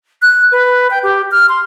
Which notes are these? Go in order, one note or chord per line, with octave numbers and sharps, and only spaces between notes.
F#6
B4
G5
G4
F6
C6